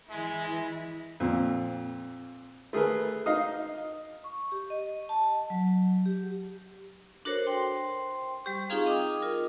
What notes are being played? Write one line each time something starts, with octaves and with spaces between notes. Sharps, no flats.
E3 G#3 E4
F2 A#2
A3 G#4 A#4 B4
D#4 D#5 F5 D#6
C#6
G4
D#5
A5
F#3
G4
D4 F#4 A4 A#4 C5 C#5
C5 G5 C6
G3 G4 C#6
C4 D#4 F4 G#4 F5 A#5
D#5 G5 D6 D#6
F4 A#4